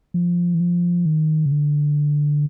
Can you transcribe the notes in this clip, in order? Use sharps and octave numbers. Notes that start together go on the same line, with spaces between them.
F3
E3
F3
D#3
C#3
D3